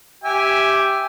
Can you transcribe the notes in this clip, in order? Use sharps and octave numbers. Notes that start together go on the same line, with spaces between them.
G4 E5 G#5